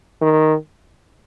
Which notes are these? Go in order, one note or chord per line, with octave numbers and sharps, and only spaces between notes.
D#3